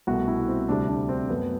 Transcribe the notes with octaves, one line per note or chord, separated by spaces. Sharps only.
C2 B2 A3 F#4
E4
C4
D2 C3 G3 D4
D4
C4
F#2 F#3 A3 B3